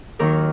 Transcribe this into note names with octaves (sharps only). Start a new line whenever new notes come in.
D#2 D#3 F#3 A#4